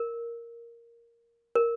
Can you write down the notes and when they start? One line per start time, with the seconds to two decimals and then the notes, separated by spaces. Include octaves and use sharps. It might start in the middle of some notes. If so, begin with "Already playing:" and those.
Already playing: A#4
1.55 A#4